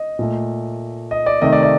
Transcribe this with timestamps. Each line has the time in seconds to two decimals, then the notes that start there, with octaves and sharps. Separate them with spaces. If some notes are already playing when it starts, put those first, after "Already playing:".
Already playing: D#5
0.19 A#2 A3
1.11 D#5
1.26 D5
1.42 C3 D#3 A3 D#5
1.53 D5
1.63 D5